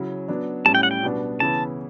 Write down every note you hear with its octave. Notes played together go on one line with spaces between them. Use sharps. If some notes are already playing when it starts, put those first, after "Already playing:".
Already playing: C#3 F#3 C#4 E4
F#3 B3 D4
A2 G3 C#4 E4 A5
G5
F#5
G5
B2 G3 B3 D4
C#3 E3 B3 E4 A5